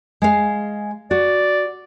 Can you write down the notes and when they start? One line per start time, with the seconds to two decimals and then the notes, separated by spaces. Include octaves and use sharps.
0.22 G#3 F5
1.11 F#4 D5